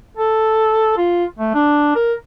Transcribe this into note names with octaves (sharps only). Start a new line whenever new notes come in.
A4
F4
A3
D4
A#4